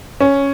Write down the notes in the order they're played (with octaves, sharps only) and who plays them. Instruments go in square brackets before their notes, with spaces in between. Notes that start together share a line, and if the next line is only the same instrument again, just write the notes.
[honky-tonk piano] C#4